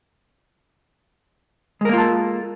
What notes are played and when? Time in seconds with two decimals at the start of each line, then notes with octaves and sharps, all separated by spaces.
1.81 G#3
1.85 A#4
1.89 A#3
1.94 F4
1.98 A4